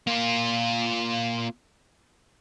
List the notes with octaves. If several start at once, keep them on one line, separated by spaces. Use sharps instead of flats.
A#3 F4